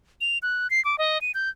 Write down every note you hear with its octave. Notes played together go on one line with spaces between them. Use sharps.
F7
F#6
C7
D6
D#5
D#7
G6